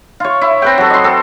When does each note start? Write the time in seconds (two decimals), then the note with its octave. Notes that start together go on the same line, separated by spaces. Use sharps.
0.20 F4 C#5
0.41 E4
0.62 C4 B4 G5
0.78 F#3 A4
0.90 D#5 C6
1.04 C4 A4